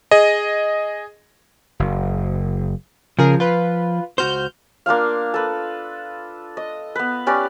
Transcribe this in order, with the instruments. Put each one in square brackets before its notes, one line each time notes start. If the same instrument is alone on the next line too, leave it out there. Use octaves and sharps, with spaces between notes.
[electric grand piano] G#4 D#5
[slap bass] F#1
[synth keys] C#3 G#4 A#4 [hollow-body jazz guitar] F3
[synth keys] F4 B4
[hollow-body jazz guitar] C#2 F#4 C5 [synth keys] F6 G6
[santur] A#3 D4 F4 F5
A4 B4
D#5
B3 B4
C#4 G4 B4 D5